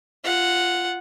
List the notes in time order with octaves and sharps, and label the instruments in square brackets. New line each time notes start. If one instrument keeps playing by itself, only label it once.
[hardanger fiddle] F4 F#5